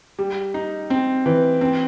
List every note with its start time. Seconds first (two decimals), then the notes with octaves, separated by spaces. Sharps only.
0.19 G3
0.54 D#4
0.90 C4
1.26 E3
1.61 C4